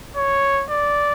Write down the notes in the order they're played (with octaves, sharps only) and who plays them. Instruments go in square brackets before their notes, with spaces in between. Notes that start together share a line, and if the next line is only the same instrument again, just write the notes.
[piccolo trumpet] C#5
D5